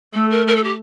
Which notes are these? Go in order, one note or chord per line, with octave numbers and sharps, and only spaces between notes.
A3 A4
A#4
A#4
A4
G4